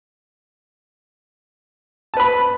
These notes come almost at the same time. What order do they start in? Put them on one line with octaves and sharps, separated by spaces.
A5 B4 B5